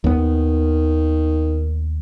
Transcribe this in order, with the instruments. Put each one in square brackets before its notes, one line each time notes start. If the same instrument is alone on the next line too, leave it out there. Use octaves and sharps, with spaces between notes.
[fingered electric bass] D#2 B3 [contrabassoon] D#3